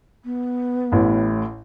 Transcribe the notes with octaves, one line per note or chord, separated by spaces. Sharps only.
B3
A1 A2